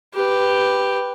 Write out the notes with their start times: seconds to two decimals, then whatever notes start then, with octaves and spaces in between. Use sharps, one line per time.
0.14 G4 B4